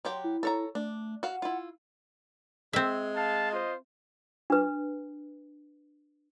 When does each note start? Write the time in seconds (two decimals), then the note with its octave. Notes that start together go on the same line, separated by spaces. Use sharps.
0.05 F#3 G4 G5 C6
0.24 E4
0.43 A4 C#5 A#5
0.75 A3 D4
1.23 F#4 F5 F#5
1.42 E4 F4
2.73 G#3 C4 E5
3.16 F5 A5
3.52 F4 C5 D#5
4.50 D4 B4